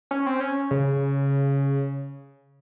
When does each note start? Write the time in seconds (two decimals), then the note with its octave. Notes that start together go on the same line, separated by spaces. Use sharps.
0.11 C#4
0.26 C4
0.40 C#4
0.71 C#3